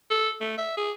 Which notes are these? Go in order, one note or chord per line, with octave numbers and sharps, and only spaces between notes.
A4
A3
E5
G#4